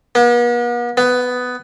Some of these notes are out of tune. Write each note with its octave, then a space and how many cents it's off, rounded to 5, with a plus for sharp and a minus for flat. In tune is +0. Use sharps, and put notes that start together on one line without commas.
B3 -45
B3 +10